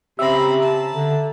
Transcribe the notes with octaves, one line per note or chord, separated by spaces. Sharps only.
C#3 C4 G4 E5 A#5 B5
A5
D3